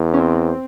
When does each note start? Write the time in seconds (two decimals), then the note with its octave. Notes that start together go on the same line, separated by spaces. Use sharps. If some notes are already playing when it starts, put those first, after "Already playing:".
Already playing: E2
0.13 C#4
0.19 C4